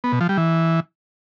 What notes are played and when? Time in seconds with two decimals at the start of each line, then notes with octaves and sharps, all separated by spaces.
0.04 B3
0.12 B2
0.21 F3
0.29 G3
0.37 E3